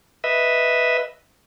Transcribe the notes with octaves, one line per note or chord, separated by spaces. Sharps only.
B4 D#5 E5